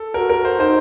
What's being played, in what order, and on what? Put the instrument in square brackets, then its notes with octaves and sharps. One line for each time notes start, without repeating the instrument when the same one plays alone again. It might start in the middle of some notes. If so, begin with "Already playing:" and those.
Already playing: [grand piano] A4
[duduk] F#4 [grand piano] A#4
[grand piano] A#4
C5
[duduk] D#4 [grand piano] C5